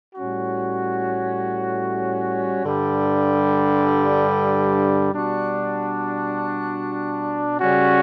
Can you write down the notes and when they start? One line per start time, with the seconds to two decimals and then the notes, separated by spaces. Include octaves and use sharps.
0.15 A2 G3 C#4 F#4
2.63 G2 D3 G3
5.10 B2 G3 D4 F#4
7.58 C#3 G3 C#4 F#4